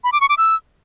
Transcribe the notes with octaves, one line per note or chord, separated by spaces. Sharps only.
B5
D6
C#6
D6
E6